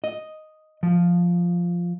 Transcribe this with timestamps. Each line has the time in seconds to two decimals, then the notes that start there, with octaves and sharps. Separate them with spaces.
0.04 D#5
0.83 F3